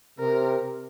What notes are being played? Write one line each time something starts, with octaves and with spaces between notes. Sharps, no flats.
C3 A#4